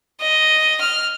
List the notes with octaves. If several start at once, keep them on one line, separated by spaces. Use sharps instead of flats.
D#5
F6